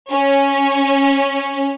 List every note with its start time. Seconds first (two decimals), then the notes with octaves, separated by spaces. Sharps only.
0.12 C#4